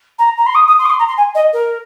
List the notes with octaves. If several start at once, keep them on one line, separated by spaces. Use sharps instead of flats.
A#5
A#5
C6
D#6
D#6
C6
D#6
C6
A#5
C6
G#5
D#5
A#4